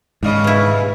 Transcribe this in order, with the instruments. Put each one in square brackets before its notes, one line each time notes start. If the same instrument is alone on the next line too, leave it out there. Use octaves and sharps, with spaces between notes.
[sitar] D#2 C#3 D#5 [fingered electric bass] G#2
[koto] B2 E4